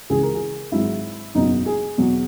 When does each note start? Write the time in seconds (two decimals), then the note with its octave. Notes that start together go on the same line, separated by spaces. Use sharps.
0.10 C#2 C#3 E3 G#3 G#4
0.23 A#4
0.34 G#4
0.72 G#1 G#2 F#3 E4
1.35 F#1 E2 B2 F#3 D#4
1.66 G#4
1.98 E2 B2 F#3